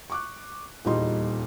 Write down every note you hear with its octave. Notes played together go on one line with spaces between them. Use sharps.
C#6 D6 F#6
D#1 E2 A#2 G3 D#4 C6